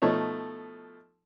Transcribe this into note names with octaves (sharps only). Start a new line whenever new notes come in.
B2 F3 A3 D#4 C#5